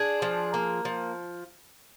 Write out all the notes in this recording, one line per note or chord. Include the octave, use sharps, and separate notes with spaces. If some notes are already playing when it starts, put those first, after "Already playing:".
Already playing: D4 G#4
F3
A#3
F3